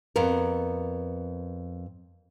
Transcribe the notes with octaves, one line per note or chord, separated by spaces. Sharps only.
F2 B3 A#4